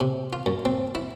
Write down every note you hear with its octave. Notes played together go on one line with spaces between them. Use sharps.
C3
F4
F#2
C4
E4